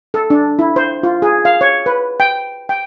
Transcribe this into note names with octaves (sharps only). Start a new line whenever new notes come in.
A4
D4
E4
C5
F4
G#4
F5
C#5
B4
G5
G5